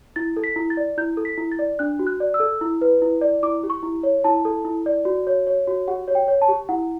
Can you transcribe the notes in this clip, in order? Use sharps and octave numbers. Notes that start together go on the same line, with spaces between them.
E4 A6
A4
B6
E4
A6
D5
E4 G6
A4
B6
E4
A6
D5
D4 F#6
F#4
F#6
D5
E6
A4
E4
B4
E4
D5
E4 D6
G4
C#6
E4
C#5
E4 A5
A4
E4
D5
F#4
C#5
C#5
F#4
G4 F#5
C#5
G5
C#5
A5
G4
E4 F#5